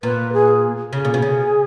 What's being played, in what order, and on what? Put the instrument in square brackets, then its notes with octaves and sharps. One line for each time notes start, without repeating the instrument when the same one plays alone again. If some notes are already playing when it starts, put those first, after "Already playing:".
[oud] A#2 [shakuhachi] B4
[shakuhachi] G#4
[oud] C#3 [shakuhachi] G#4
[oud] A#2
B2
C#3